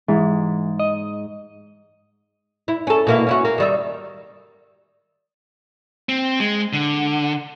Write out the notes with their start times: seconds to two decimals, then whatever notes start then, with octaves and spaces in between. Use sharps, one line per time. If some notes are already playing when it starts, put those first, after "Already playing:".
0.08 G#2 E3
0.79 D#5
2.68 E4
2.87 C#4 A4
3.07 B2 A#3 E4
3.26 C#4 E4 F#4
3.45 A#3
3.58 D#3 G3 E5
6.09 C4
6.40 G#3
6.73 D3